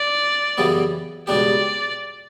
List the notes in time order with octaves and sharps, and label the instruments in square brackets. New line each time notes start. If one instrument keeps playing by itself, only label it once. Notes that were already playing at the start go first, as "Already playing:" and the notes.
Already playing: [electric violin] D5
[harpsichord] F#2 C#3 E3 G3 B3
[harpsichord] C#2 B2 G3 D4 G4 [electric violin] D5